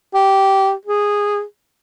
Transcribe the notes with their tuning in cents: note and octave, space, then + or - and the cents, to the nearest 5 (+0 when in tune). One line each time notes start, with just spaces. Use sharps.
G4 -15
G#4 -10